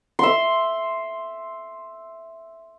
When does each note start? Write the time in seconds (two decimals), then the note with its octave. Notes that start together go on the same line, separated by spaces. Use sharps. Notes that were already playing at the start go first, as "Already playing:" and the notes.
0.19 E5 C6